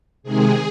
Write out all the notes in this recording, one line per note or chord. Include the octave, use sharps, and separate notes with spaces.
C3 D#3 G#3 G#4